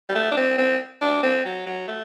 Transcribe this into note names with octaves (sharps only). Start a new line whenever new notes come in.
G3
A3
D4
C4
C4
D4
C4
F#3
F#3
A3